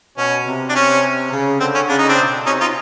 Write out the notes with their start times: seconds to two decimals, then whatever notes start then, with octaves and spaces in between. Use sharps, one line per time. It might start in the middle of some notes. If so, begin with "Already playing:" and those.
0.17 B2 C#4
0.45 C3
0.69 D4
0.75 C#4
1.32 C#3
1.60 D3 C4
1.74 C#4
1.89 C#3 D4
1.98 D#4
2.08 C4 D4
2.18 B2
2.46 C3 C#4 D#4
2.60 D#4 F4